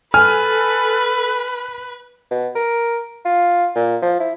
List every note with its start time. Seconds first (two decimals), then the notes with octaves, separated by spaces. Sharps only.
0.14 A4 B4 G#5 F6
2.31 B2
2.55 A#4
3.25 F4
3.75 A#2
4.02 F3
4.20 E4